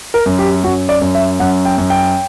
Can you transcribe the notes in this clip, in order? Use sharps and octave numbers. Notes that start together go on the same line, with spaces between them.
A#4
F#2
G4
F#2 F#4
D5
F#2
E5
F#2 F#5
G5
F#2
G5